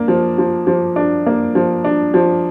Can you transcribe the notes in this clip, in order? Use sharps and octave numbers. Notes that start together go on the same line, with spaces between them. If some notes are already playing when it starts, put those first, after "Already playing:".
Already playing: A#3 D4
F3
F3
F3
D4
A#3
F3
D4
F3